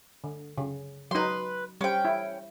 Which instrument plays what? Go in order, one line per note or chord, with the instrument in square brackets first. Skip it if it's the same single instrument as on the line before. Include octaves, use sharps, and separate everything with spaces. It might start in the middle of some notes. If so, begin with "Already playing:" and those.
[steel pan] D3
C#3
[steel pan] F#3 D#4 [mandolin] B4 C6
[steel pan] G3 C5 [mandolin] C#4 G5
[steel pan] E4